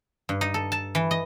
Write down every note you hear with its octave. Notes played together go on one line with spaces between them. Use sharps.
G2
D#4
A4
A5
E3
D#5